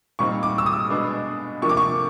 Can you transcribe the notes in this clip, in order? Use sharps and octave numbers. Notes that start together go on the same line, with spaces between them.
A#2 G3 C4 D#4 C#6
D6
E6
D#6
B2 G#3 B3 D4
C3 F3 A#3 D4 C#6
D6
C#6